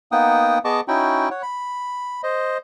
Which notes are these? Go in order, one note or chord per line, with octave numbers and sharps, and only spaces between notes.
A#3 B3 D#4 F#5 G5 D#6
B3 G#4 D#5 A5 C#6 D6
C#4 D#4 E4 F#4 G5
C#5 F#5
B5
C5 D#5